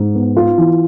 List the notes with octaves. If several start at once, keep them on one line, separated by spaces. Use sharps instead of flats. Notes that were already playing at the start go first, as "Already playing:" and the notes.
Already playing: G#2
B3
F4
E3